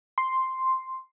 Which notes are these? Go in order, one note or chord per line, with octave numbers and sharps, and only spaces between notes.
C6